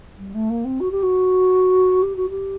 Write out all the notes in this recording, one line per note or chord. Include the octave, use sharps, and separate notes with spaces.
G3
A3
A#3
C4
F#4
G4
F#4
G4
F#4
G4